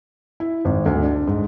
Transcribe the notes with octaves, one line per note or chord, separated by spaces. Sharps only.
E4
G#1
D2
D4
G#2